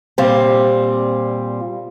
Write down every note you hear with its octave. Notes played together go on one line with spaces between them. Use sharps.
A#2 G3 C4